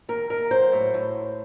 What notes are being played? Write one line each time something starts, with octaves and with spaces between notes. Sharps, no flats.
D#2 A#4
D#2 A#4
F#3 C5
A2
A2